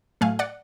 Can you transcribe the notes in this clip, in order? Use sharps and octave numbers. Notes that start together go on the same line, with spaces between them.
A2 F#3 A3 F5 G#5
D5 F#5